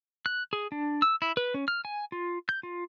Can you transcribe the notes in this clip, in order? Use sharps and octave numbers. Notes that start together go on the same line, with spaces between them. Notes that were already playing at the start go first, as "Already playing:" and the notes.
F#6
G#4
D4
E6
E4
B4
C#4
F6
G#5
F4
G6
F4